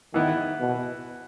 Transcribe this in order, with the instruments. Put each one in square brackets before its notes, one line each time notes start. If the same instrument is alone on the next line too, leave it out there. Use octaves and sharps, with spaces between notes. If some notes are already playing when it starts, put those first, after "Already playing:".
[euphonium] D#3 [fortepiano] E3 B3 E4
[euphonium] B2